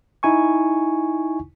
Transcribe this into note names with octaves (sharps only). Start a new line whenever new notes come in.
D#4 E4 G#5 C#6